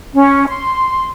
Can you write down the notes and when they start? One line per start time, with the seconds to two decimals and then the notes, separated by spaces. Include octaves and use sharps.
0.15 C#4
0.48 C6